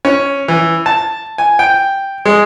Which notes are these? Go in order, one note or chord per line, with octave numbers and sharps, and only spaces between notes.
C#4
E3
A5
G#5
G5
G#3